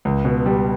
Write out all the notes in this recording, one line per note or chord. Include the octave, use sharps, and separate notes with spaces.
C#2
B2
G3